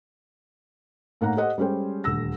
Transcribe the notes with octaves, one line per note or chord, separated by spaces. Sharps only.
A2 A#3 D#4 F#5 A#5
G4 A4 C5 D#5 F#5
G3 G#3 C#4 A4 C5 G5
D#1 D2 E6 A#6